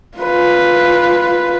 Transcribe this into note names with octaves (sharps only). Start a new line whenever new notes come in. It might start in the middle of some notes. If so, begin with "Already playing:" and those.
F4 B4